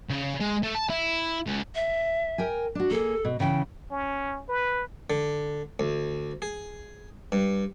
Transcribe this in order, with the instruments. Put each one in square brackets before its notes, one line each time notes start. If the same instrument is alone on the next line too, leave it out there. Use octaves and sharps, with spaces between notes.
[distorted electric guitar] C#3
G#3
A3
A5
E4
C#2
[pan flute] E5
[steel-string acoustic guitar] A#4 G5 G#5
D4 F#4
[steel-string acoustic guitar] A#3 G#4 [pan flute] A4
[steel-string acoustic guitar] B2
[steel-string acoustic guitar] C#3 E3 [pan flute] G5
[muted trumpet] C#4
B4
[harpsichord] D3
D2
G#4
G2